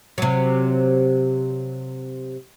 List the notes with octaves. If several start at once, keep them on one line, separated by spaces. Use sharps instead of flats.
C3 F#3